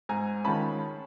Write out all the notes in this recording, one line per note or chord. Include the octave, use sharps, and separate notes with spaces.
G#2 G#5 A#5
D#3 G#3 C#4 F4 A5 B5